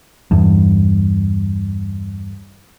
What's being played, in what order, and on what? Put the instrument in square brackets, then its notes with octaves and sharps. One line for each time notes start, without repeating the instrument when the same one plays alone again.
[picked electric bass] E2 G2